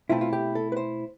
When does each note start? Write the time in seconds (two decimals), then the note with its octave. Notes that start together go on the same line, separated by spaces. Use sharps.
0.09 B2 A3 C4 E4 F4
0.21 F4
0.33 G4
0.55 A4
0.72 B4
0.77 C5